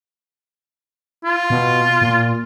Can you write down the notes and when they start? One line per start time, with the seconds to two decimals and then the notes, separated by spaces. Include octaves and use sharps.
1.24 F4
1.50 B2
2.02 A#2